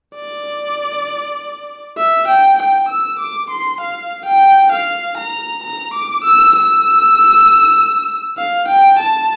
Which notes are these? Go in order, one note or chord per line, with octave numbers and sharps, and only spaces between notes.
D5
E5
G5
G5
E6
D6
C6
F5
G5
F5
A#5
A#5
D6
E6
E6
F5
G5
A5